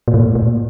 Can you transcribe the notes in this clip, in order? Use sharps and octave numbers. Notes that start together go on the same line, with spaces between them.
A#2
A2
A#2